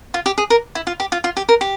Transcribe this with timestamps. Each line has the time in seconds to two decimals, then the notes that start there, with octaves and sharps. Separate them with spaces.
0.14 F4
0.26 G4
0.38 G#4
0.50 A#4
0.75 E4
0.87 F4
1.00 G4
1.12 F4
1.24 F4
1.37 G4
1.49 A#4
1.61 G4